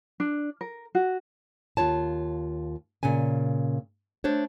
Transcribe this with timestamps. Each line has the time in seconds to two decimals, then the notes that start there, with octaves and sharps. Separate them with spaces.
0.20 D4
0.61 A#4
0.95 F#4
1.77 D#2 F4 C#5 A5
3.03 A#2 C#3 C#4 G#5
4.24 A3 D4 C5 C#5